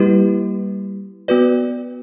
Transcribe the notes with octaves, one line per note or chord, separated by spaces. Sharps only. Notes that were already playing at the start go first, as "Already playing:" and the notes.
Already playing: G3 A#3 E4 G4 B4
B3 F#4 B4 D5